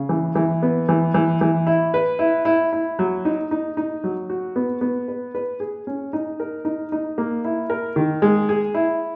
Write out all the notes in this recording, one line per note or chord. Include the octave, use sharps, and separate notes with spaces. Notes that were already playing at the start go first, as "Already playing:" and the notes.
Already playing: C#3
E3
E3
B3
E3
E3
E3
E4
B4
E4
E4
E4
F#3
D#4
D#4
D#4
F#3
F#4
B3
B3
B4
B4
G#4
C#4
D#4
A#4
D#4
D#4
A#3
E4
A#4
D#3
G#3
G#4
E4